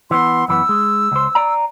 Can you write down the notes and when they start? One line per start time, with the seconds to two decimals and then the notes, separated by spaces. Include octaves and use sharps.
0.11 E3 B3 C6
0.48 F#2 E3 B3 E6
0.69 G#3
1.12 C#2 C5
1.35 D5 A#5